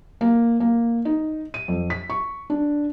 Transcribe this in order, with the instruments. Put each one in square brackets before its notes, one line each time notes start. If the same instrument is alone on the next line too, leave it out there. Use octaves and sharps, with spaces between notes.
[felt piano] A#3
A#3
D#4
D#7
F2
B6
C#6
D4